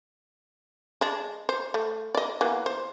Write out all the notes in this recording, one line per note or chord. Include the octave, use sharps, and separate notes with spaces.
G#3 D4
C5
A3
D5 D#5
E3 A#3 B3
C5